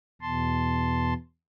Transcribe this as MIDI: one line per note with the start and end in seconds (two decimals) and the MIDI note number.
0.22 1.14 40
0.22 1.14 47
0.22 1.14 81
0.22 1.14 84